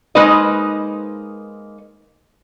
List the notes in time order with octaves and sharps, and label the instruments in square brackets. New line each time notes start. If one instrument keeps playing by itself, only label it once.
[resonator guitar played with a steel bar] G#3 A#3 D#4 B4 C5 D#5